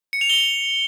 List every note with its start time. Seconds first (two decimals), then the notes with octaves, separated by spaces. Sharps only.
0.13 C#7
0.21 F7
0.30 G7